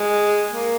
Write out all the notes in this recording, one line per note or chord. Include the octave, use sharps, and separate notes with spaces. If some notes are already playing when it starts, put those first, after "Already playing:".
Already playing: G#3
A#3